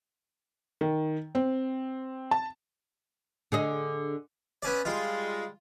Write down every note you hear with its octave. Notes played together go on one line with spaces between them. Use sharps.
D#3
C4
A5
D3 G#4 D#5
B3 C#4 D5
G3 G#3 F4